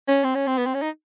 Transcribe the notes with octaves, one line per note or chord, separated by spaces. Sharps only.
C#4
C4
C#4
C4
B3
C4
C#4
D#4